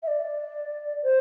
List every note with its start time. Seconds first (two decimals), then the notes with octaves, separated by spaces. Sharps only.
0.03 E5
0.08 D5
1.03 C5